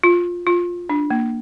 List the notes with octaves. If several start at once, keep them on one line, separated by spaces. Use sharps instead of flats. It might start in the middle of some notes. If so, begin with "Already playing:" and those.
F4
F4
D4
A#3